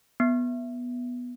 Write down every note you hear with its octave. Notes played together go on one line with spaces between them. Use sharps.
B3